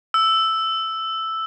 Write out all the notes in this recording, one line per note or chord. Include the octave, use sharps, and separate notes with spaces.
E6